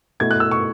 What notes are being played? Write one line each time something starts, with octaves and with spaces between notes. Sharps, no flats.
B2 A3 E4 G#6
F#6
E6
C#6